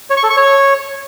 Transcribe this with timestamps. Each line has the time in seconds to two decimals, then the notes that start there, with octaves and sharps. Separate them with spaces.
0.10 C#5
0.17 C#6
0.23 A4
0.30 C#6
0.37 C#5